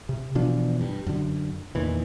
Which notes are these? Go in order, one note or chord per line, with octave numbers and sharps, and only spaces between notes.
C3
B2 E3 F3 D4
G2
F#2 D3
E2 A#2 D#3 E3